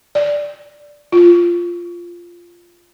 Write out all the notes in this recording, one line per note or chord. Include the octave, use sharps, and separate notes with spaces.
D5
F4